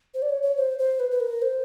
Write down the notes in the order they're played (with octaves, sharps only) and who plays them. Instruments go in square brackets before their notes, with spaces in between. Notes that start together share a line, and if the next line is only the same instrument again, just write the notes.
[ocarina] C5
D5
C#5
C#5
C5
C5
B4
B4
A#4
C5